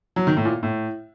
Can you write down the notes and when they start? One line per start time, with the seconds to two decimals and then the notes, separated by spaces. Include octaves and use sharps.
0.16 F#3
0.27 D#3
0.37 A2
0.45 A#2
0.63 A2